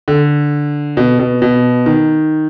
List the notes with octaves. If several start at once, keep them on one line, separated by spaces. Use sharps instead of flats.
D3
B2
B2
B2
D#3